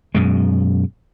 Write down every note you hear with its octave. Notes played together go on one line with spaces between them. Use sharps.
F#2 B2 G#3